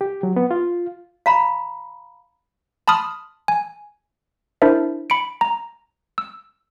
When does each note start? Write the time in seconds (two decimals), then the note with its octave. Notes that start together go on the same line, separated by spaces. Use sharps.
0.01 G4
0.23 F#3
0.36 B3
0.51 F4
1.26 F5 A#5 B5
2.88 A5 B5 C6 D#6 F6
3.48 G#5
4.62 D4 E4 A#4 C5 E5
5.10 B5 C#7 D7
5.41 A#5
6.18 E6